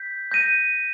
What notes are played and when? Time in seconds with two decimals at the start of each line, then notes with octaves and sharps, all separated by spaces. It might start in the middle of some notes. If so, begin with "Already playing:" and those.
Already playing: G6 B6
0.31 G6 A#6 D#7